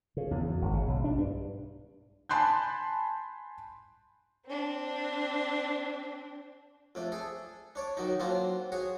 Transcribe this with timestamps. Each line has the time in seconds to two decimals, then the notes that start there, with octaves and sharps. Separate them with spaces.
0.17 C#3
0.31 E2
0.49 F#2
0.62 G#1
0.74 C#3
0.87 B1
1.04 D4
1.18 G2
2.29 G#5 A5 B5 C6 F#6 G6
4.46 C4 D4
6.95 F2 A3 D4
7.12 G#4 A4
7.75 D4 C#5 D5
7.97 D#3 F#3 D#4
8.20 F#3 A#3 C4 D4 F4
8.72 F#4 G#4 C#5